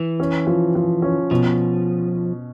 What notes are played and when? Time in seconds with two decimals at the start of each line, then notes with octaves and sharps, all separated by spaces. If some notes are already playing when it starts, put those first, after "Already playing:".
Already playing: E3
0.20 C#4
0.47 F3
0.75 F3
1.02 C#4
1.31 B2 F3